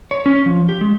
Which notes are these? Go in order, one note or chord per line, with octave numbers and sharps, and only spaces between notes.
C#5
C#4
F3
G4
G#3